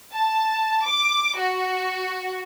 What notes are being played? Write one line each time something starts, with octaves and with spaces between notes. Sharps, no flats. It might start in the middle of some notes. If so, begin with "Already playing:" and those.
A5
D6
F#4